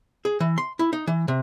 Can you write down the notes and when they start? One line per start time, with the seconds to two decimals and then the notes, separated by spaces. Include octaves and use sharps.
0.25 G#4
0.40 E3
0.58 C6
0.79 E4
0.93 D#4
1.07 E3
1.28 C3